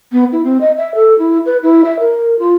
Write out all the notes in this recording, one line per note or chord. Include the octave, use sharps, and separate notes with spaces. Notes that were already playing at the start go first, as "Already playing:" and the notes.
B3
E4
C4
D#5
E5
A4
E4
B4
E4
E5
A#4
F4